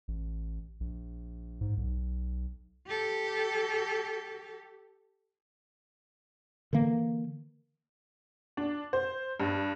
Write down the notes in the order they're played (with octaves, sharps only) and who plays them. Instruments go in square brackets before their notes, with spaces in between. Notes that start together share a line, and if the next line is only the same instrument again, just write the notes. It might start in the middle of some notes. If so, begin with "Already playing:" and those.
[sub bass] A1
A#1
G#2
B1
[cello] G4 A4
[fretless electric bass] D3 E3 A#3
[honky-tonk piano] D4
C5
G2